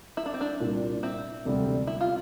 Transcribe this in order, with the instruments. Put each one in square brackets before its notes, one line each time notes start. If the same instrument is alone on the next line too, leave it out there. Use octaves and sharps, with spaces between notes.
[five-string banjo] E4
D4
C4
D4
[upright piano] C2 A#2 G3
[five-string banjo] C4 E4
[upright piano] E1 D2 C3 G3
[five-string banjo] E4
F4